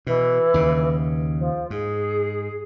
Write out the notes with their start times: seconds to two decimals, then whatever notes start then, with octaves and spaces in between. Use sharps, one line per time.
0.07 B2 E3
0.54 D#2 C#3
1.39 F3
1.70 G#2 G#4